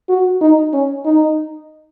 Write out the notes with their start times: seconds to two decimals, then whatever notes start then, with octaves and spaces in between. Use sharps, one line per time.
0.09 F#4
0.41 D#4
0.73 C#4
1.05 D#4